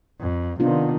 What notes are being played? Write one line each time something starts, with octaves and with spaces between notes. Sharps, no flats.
F2
C3 D#3 B3 D4 F4